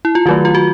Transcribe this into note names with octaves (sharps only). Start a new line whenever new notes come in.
E4
F4
D#3 F#3 A3 F#4
F4
F#4